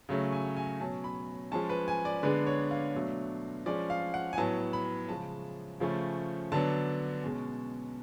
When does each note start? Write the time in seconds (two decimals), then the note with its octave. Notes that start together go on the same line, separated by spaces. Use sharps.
0.09 C#3 F#3 A3 C#4
0.33 G#5
0.56 G#5
0.80 B2 F#3 C#4 A5
1.04 B5
1.52 F3 G#3 C#4 A5
1.69 B4
1.88 G#5
2.05 D5
2.23 D3 G#3 B3 D4 B4
2.47 C#5
2.71 F5
2.94 B2 F#3 A3 D4
3.66 F3 G#3 C#4 D5
3.90 F5
4.14 F#5
4.33 G#5
4.37 A2 F#3 B3 A5
4.73 B5
5.09 C#3 F3 G#3 A5
5.80 C#3 F3 A3 C#4
6.52 D3 F#3 B3 D4 A5
7.23 B2 G#3 C#4